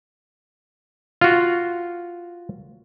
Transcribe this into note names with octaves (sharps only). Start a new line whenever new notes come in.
F4 F#4